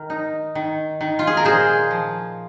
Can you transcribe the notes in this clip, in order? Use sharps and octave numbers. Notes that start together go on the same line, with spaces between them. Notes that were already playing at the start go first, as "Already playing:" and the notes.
Already playing: D#3 A#4
D#4
D#3
D#3
F4
G#4
A#4
A#2 G#4 C5
F3